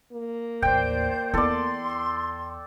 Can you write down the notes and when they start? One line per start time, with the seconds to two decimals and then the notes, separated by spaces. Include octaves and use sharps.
0.13 A#3
0.62 A1 D#2 C5 D5 G5 G6
1.34 E2 E4 A4 D5 C6